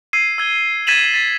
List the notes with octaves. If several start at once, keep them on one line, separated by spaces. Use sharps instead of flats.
E6 G#6 C7 D#7
E6 G#6 G7
G#6 A6 B6 D#7 E7 F#7
A6 B6 D#7